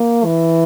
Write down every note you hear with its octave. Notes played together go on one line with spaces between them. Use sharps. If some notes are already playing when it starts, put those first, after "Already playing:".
Already playing: A#3
E3